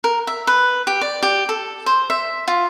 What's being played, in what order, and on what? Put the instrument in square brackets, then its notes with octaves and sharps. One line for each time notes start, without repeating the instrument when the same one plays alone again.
[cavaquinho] A#4
E5
B4
G4
D5
G4
A4
C5
E5
F4